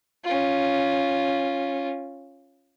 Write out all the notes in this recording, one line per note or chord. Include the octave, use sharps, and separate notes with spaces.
C#4 F4